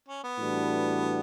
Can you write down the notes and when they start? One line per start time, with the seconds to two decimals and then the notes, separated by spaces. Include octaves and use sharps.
0.08 C#4
0.24 B3
0.39 A2 E3 G3 D4 F#4